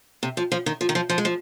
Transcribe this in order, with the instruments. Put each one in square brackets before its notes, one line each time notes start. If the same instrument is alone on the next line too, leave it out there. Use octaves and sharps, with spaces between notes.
[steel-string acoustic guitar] C3
F3
F3
D#3
F3
D#3
F3
F3
G#3
F3